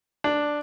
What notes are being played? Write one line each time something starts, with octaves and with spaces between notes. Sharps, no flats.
D4